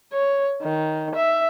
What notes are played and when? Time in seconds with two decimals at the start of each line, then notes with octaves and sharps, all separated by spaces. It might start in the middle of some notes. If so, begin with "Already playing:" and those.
0.12 C#5
0.62 D#3
1.15 E5